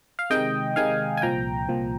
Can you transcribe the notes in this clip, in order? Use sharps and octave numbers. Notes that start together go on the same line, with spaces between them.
F5
C3 D#3 G#3 D#4 D#5 G5
C3 D#3 G#3 D#4 F5 G#5
G#5
C2 A#2 F3 G5 A#5
C2 A#2 F3